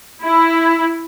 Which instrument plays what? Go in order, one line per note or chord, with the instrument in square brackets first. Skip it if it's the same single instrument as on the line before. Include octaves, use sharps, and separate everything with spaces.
[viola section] E4